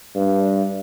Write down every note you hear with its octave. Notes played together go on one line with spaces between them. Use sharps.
G2